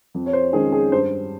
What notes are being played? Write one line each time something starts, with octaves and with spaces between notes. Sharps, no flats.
F2
C#5
C5
D#3 G#3 C#4 G#4
G#4
G2 C5